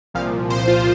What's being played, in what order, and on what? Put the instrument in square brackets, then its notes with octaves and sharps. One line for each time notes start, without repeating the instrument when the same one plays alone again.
[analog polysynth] C2 A#2 F3 F5
C2 A#2 F3 C5
F4